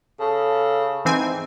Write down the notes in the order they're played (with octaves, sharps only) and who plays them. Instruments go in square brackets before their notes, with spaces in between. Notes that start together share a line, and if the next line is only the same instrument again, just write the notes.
[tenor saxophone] C#3 [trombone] A4
[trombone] G#2 [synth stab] E3 C4 G#5